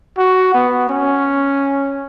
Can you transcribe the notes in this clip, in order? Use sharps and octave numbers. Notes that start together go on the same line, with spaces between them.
F#4
B3
C#4